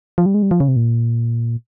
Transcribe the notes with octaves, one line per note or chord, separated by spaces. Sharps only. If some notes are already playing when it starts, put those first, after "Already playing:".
F3
G3
G#3
G3
F3
C#3
C3
A#2